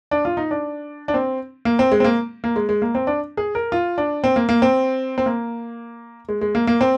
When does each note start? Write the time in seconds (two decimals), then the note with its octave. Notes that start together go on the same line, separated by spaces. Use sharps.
0.11 D4
0.25 F4
0.37 D#4
0.51 D4
1.08 D4
1.14 C4
1.65 A#3
1.79 C4
1.92 G#3
2.00 C4
2.04 A#3
2.44 A#3
2.56 G#3
2.69 G#3
2.82 A#3
2.95 C4
3.07 D4
3.37 G#4
3.55 A#4
3.72 F4
3.98 D4
4.24 C4
4.36 A#3
4.49 A#3
4.62 C4
5.18 C4
5.26 A#3
6.29 G#3
6.41 G#3
6.55 A#3
6.67 A#3
6.81 C4